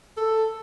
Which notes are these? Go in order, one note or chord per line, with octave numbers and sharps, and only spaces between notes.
A4